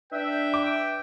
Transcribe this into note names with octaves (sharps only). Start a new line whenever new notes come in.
D4 B4 E5 G5
D6